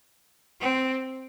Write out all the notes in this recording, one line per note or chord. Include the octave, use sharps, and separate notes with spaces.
C4